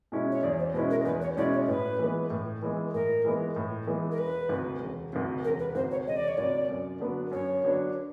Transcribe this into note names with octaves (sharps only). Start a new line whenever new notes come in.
B2 G#3 C#4 E4
C#5
E2 D5
C5
B2 G#3 C#4 E4 B4
A#4
E2 B4
C#5
B2 G#3 C#4 E4 D5
C#5
A2 B4
E3 G#3 B3
A2
E3 G#3 B3
A2 A#4
E3 G#3 B3
A2
E3 G#3 B3
A#4
E1 B4
D2 C3
E1
D2 C3
E1 A#4
B4
D2 C3 C5
C#5
E1 D#5
D5
C#5
D2 C3 D5
F#2
D3 F#3 B3 D4
F#2 C#5
D3 F#3 B3 D4